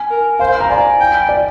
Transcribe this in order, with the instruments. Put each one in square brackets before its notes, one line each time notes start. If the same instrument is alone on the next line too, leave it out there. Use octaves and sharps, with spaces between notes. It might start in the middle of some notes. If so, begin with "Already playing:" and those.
Already playing: [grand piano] G#5
[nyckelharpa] A#4
[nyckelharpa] C5 [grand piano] F5
[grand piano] A#5
[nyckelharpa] D5 [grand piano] G#5
[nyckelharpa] G5
[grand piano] D5